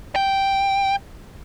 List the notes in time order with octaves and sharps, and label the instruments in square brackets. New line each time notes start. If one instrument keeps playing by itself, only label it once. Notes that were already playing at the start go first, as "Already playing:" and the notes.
[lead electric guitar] G5